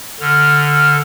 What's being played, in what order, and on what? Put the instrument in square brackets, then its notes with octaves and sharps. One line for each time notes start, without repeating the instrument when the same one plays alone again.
[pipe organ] D3 [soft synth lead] F6